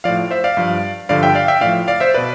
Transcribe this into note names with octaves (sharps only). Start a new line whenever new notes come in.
A2 F3 D5 F5
C5 E5
D5 F5
G2 F3
G2 D3 F3 D5 F5
E5 G5
D5 F5
E5 G5
A2 F3 D5 F5
D5 F5
C5 E5
B2 B4 D5